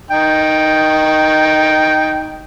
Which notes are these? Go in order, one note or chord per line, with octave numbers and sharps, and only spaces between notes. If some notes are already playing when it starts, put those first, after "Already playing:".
D#4 G5